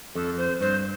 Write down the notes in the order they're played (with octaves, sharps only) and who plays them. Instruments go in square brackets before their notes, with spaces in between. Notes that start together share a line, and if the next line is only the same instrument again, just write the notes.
[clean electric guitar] F2 [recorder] A4
[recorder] C5
[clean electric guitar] G2 [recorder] C5